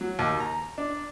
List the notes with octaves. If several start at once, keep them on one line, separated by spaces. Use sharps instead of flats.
F#3
D#2
A#5
D4